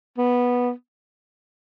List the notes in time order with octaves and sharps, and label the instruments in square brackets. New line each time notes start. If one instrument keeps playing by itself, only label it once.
[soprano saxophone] B3